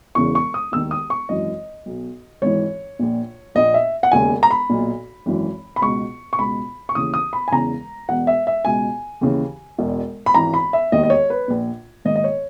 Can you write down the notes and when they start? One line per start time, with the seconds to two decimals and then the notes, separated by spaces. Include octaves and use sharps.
0.15 E1 E2 C#3 E3 C#6
0.35 C#6
0.54 D#6
0.72 E1 D#2 D#3 E6
0.91 D#6
1.10 C#6
1.29 G#1 F#2 E3 D#5
1.86 B1 B2
2.42 G#1 G#2 E3 C#5
2.99 A#1 A#2
3.55 A#1 A#2 D#5
3.74 E5
4.03 F#5
4.12 E1 D#2 C#3 G#5
4.43 A#5
4.51 B5
4.69 B1 A#2
5.26 G#1 F#2 E3
5.76 B5
5.81 C#2 B2 C#6
6.33 C#6
6.39 C#2 B2 B5
6.89 C#6
6.95 D#2 C#3 E3 D#6
7.14 D#6
7.33 B5
7.48 G#5
7.51 E1 E2 C#3 E3 A#5
8.09 E1 E2 B2 F#5
8.27 E5
8.47 E5
8.65 C#2 B2 G#5
9.21 D#2 C#3 E3
9.78 E1 E2 B2
10.26 B5
10.34 G#1 G#2 E3 A#5
10.54 B5
10.73 E5
10.92 E1 D#2 D#3 D#5
11.03 D#5
11.10 C#5
11.30 B4
11.48 A#1 A#2
12.05 A#1 G#2 D#3 D#5
12.16 D#5
12.24 C#5